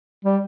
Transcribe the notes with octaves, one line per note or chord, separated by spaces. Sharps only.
G3